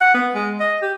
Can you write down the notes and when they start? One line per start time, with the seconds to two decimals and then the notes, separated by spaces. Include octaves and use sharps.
0.01 F#5
0.14 B3
0.35 G#3
0.60 D#5
0.82 G4